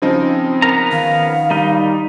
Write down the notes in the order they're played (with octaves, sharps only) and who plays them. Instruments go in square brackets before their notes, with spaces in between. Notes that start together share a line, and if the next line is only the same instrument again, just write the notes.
[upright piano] C#3 F3 D#4 [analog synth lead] C4
[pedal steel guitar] B3 A#4 A#5
[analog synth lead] D#3 [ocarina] F5
[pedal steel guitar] G3 D#4